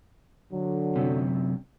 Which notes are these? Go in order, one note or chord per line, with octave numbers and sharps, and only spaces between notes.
D3 F#3
F#2 C3